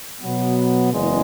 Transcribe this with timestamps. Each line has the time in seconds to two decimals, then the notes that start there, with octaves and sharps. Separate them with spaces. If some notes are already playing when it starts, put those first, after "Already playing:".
0.21 B2 F#3 B3
0.92 F#1 E2 C#3 G#3